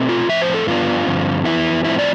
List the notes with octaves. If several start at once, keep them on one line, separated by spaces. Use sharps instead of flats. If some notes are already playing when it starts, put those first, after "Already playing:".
Already playing: B2 A3 C4
F4
A2 F3 C4 E5
C5
A4
G2 F3 B3 D4 F4
G2 D3 F3 C4
F2 E3 B3 E4
A2 F3 C4 E4
D5